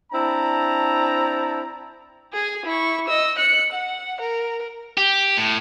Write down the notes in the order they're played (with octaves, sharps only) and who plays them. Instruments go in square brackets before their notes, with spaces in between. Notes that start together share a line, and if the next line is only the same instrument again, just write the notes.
[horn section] C4 D4 E4 A5 A#5
[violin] G#4 G#5
E4 C#6
D#5 E6
F#6 C#7
F#5
A#4
[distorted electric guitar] G4
A2